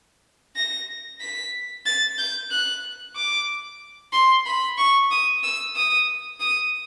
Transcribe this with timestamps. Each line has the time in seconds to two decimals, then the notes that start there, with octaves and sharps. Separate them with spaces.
0.56 A#6
1.21 B6
1.86 A6
2.18 G6
2.51 F#6
3.16 D6
4.13 C6
4.46 B5
4.78 C#6
5.11 D#6
5.44 E6
5.76 D#6
6.40 D#6